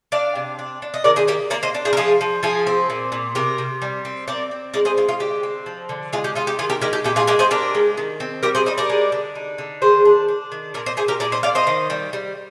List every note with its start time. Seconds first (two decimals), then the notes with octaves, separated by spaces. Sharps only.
0.12 D4 D5 F5
0.35 C3
0.59 D4
0.82 D4
0.94 D#5
1.04 D#3 A#4 D5
1.16 G#4 C5
1.28 A#3 G4 A#4
1.50 A#3 A#4 D5
1.63 C5 D#5
1.75 D4
1.85 G#4 C5
1.93 A#4
1.97 F3 F4 G#4
2.21 F3
2.43 F3 F4 G#4
2.67 C4
2.90 A#2
3.12 A#2
3.35 C3 G4 A#4
3.58 C3
3.82 G3
4.05 C4
4.28 C4 A#4 D5
4.51 C4
4.74 G#3 A#4 D5
4.85 G#4 C5
4.97 G#3 F4
5.09 F4
5.20 D3 G4
5.43 C4
5.66 F3
5.89 D3
6.13 G#3 F4 G#4
6.24 G4
6.35 D#4 F4
6.47 G4
6.59 D#3 F4 G#4
6.70 G4 A#4
6.81 G#3 G4 A#4
6.93 G4
7.04 A#2 G4
7.16 F4 G#4
7.27 G#3 G4 A#4
7.39 G#4 C5
7.51 D4 G4 A#4
7.75 G#3
7.97 D#3
8.20 C4
8.43 G3 G4 A#4
8.55 G#4 C5
8.66 G3 C5 D#5
8.78 A#4 D5
8.90 G#3
9.12 D3
9.35 D#4
9.58 D3
9.82 D#3 G#4 C5
10.05 D4
10.29 D4
10.52 D#3
10.74 A#2 A#4 D5
10.86 C5 D#5
10.97 A#2 G#4 C5
11.08 G4 A#4
11.20 A#2 A#4 D5
11.32 C5 D#5
11.43 A#2 D5 F5
11.55 C5 D#5
11.67 D#3
11.90 G3
12.13 G3